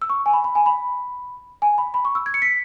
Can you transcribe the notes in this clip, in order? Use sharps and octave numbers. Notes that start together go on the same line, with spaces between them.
E6
C#6
G#5
B5
B5
G#5
B5
G#5
B5
B5
C#6
E6
G#6
C#7
B6